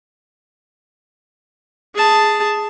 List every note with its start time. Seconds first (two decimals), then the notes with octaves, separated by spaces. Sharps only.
1.95 G#4 A5